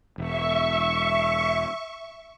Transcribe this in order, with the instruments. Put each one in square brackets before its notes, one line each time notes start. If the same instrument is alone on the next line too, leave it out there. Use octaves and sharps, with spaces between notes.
[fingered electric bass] E1 [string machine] E5 C#6